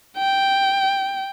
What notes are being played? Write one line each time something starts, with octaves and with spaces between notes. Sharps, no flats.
G5